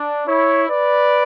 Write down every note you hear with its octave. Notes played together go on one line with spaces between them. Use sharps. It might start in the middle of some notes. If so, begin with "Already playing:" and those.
Already playing: D4
E4 C#5
B4 D5